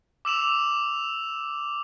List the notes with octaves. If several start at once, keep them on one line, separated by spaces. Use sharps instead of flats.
D6 E6 E7 F7